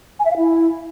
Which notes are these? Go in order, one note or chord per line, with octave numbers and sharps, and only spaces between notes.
G#5
E5
F5
E4